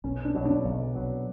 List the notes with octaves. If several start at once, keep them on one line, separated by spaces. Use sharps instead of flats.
B1 C#4
D4
B2 F#3
D4
B1
B2 F#3